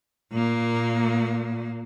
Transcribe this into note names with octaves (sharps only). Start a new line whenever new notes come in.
A#2 A#3